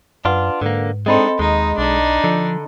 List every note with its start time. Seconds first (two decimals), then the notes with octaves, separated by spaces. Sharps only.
0.25 F#2 D4 F4 B4 F#5
0.62 G#2 D3 A#3
1.06 G#3 C4 D4 D#4 A4 D#5 B5 C6
1.39 D#2 G#3 D#4
1.78 B1 D4 D#4
2.24 D3 F3